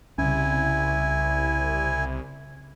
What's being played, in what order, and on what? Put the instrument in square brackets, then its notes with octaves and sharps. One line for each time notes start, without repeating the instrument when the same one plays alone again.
[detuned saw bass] C2 [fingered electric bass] C#3 C#4 [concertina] E4 G#5